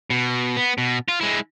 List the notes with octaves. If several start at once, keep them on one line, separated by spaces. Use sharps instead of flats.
B2
B3
B2
F4
G#3 E4